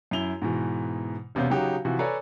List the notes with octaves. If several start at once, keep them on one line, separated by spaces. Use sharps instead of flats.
F#2 E4 F7 G7
G#2 B2 E3
E1 C3 B3 C#4 F5 G6
C#3 F#3 D#4 F#4 G4
C3 E3 F3 F#4
A4 B4 C#5 D5 G#5 A#5